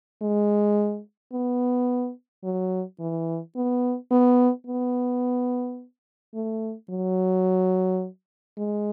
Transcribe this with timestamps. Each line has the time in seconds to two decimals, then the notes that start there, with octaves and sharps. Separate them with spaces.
0.22 G#3
1.33 B3
2.44 F#3
3.00 E3
3.56 B3
4.12 B3
4.67 B3
6.34 A3
6.90 F#3
8.57 G#3